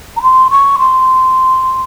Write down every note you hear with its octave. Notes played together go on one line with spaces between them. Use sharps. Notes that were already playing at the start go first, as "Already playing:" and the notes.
A#5
C6
C#6
C6